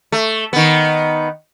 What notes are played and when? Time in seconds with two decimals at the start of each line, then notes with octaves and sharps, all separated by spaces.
0.12 A3
0.53 D#3 B3